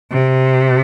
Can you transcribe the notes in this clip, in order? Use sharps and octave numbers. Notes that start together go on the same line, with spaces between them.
C3